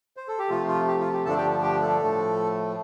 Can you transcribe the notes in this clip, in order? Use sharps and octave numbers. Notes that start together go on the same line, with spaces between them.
C5
A4
G4
C3 F3 A3 F4
F4
G4
F4
G4
G2 D3 F3 A3 D4 A4 A5
G4 G5
G4 G5
A3 A4
A2 F3 A3